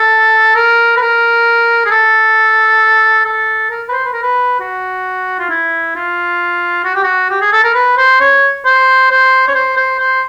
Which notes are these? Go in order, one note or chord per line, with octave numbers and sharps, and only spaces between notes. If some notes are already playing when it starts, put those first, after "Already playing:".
Already playing: A4
A#4
B4
A#4
G#4
A4
A4
A#4
B4
C5
B4
A#4
B4
F#4
F4
E4
F4
F#4
G4
F#4
G4
G#4
A4
A#4
B4
C5
C#5
C5
C5
C#5
C5
C5
C5